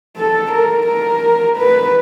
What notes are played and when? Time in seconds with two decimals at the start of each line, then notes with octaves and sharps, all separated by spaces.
0.17 A4
0.51 A#4
0.87 A#4
1.57 B4